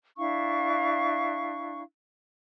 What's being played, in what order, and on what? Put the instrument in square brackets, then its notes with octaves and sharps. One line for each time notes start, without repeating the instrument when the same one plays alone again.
[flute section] D4 E4 F5 C#6